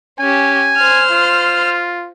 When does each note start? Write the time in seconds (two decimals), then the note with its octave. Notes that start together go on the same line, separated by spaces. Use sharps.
0.20 C#4 G4 G#5
0.77 C5 F6
1.11 F4